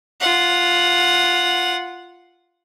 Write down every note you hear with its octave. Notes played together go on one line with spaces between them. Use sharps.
F4 F#5